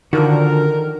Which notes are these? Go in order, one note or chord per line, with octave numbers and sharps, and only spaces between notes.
D3 D#3 F3 F4 F#4 A#4